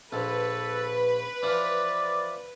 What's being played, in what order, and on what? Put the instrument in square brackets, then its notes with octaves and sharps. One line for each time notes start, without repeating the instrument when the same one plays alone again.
[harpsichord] A#1 [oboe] A4 [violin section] B4
[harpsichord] E3 F3 [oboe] D5